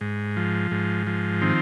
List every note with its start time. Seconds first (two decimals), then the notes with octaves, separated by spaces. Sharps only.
0.01 G#2
0.37 F3
0.71 G#2
1.07 F3
1.42 D#3 C4